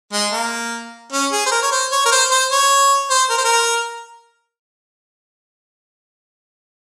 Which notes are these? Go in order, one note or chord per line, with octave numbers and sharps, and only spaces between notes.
G#3
A#3
C#4
G#4
C5
A#4
C#5
C5
C#5
A#4
C5
C5
C#5
C5
A#4
C5
A#4